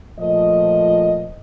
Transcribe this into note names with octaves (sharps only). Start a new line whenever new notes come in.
A#2 F3 A3 D#5